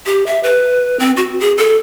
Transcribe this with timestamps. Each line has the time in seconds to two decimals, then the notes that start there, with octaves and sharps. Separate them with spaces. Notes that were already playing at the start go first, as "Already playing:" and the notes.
0.06 G4
0.26 E5
0.43 B4
0.99 C4
1.17 F#4
1.40 G#4
1.58 A4